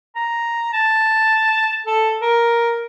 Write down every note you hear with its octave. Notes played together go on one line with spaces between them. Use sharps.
A#5
A5
A4
A#4